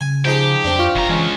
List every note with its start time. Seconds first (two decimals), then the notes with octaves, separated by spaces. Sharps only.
0.01 C#3 G#5
0.25 F3 D#4 G4 G#4
0.64 F2 C4 D4
0.79 F4 C#6 F6
0.95 F1 E3 A#5
1.09 E3 G#3 C#4